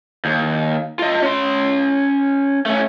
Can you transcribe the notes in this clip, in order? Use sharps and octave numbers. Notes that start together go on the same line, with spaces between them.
D#2
F4 D#5
C#4 C6
A3 C#4